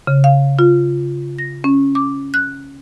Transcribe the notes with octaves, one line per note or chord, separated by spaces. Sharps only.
C#3
F5
F4
A#6
C#4
D6
F#6